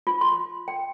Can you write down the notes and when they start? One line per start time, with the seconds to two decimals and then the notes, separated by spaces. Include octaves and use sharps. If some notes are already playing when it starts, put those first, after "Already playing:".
0.07 F4
0.21 C6
0.68 G5